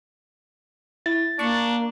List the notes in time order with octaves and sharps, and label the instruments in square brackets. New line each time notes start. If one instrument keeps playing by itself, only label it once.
[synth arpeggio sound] E4 [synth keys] A6
[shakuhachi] A#3 [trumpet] D4 [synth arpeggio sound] C#6